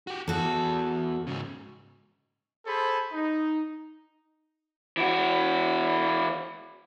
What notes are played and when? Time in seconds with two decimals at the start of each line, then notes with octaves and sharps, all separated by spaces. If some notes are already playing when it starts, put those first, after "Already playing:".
0.07 F#4 G4
0.28 E2 F#4 A4
1.27 G#2 C#3
2.66 G#4 A4 C5 B5
3.12 D#4
4.97 E3 F#4